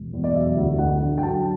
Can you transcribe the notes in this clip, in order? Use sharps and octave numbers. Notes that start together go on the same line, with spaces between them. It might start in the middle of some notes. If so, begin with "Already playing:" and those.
Already playing: E1
E2
D5
F#3 E5
D2
D2 F#5
D3
G5
F#3 A5